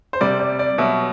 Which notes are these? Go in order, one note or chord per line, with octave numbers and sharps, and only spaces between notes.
C5
C3 G3 D5
D5
D5
B2 F#3 E5